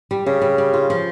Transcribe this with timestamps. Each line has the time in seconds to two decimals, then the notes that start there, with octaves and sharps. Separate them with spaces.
0.11 G3
0.26 C#3 G3
0.42 G3
0.58 G3
0.73 F4
0.90 F3